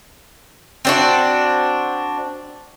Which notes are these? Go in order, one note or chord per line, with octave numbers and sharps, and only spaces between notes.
C4 D4 F#4